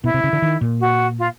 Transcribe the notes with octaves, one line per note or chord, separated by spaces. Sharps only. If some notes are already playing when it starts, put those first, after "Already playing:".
B2 E4
C3
C#3
D3
D#3
A#2
F#4
F4